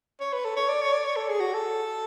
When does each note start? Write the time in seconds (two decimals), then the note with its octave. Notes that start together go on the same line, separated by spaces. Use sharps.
0.20 C#5
0.33 B4
0.45 A4
0.57 C#5
0.69 D5
0.81 C#5
0.93 D5
1.04 C#5
1.17 A4
1.29 G#4
1.40 F#4
1.54 A4